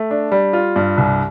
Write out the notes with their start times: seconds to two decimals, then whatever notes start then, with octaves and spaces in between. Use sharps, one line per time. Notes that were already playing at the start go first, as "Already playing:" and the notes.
Already playing: A3
0.11 D4
0.32 G3
0.53 F4
0.76 G2
0.97 C2